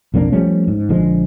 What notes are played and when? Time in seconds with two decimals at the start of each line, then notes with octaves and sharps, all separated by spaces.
0.14 B1 F2 A#3 D4
0.32 F3 G3 A3 C#4
0.68 G#2
0.89 A#1 D3 F3 G#3